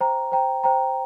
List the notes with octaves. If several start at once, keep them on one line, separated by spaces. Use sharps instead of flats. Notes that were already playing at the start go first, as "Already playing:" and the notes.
C5 G5 A#5
C5 G5 A#5
C5 G5 A#5